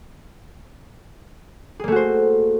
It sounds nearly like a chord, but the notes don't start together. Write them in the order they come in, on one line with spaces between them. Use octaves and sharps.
G#4 A#3 A3 F#4 C5